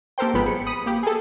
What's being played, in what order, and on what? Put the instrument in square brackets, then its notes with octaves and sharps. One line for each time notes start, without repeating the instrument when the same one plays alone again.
[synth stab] A#3 G4 A4 A#4 C5 G5
G#1 F3 G#3 B3 B5
G#4 C#7
B5 D#6
A#3 G4
G#4 A4